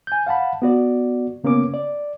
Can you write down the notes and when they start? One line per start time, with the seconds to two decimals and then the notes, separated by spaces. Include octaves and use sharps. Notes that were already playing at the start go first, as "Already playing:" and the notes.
0.07 G#5 G6
0.27 F5 F#5 A5 B5
0.62 B3 F#4 D5
1.44 C#3 A#3 B3 C#4 D6
1.74 D5